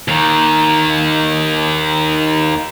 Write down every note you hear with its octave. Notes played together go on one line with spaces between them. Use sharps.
D#2 D#3